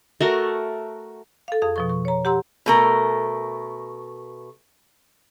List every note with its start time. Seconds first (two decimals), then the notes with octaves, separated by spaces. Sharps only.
0.21 A3 F#4 A#4
1.48 A4 F5
1.62 F2 G#4 F5 D#6
1.76 B2 F3 C#6
1.89 C#6
2.05 C#5 A#5
2.25 G4 F#5 A#5 C6 E6
2.66 B2 A3 A#4